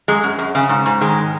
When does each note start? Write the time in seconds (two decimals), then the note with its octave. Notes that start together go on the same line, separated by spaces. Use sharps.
0.08 F#2 G#3
0.23 F#2
0.38 F#2
0.55 C#3
0.69 G#2
0.86 G#2
1.01 D#3 G#3